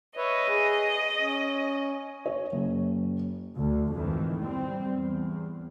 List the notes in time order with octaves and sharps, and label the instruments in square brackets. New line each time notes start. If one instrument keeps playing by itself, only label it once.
[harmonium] B4 C#5 E5 [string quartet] D#5
[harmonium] G#4
C#4
[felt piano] C#5
F#1
[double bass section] D2
F2 G#2 D#3 E3
G3 C4
E2